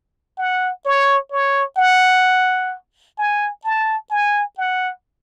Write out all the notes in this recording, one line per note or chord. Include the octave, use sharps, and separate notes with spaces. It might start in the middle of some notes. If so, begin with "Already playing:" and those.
F#5
C#5
C#5
F#5
G#5
A5
G#5
F#5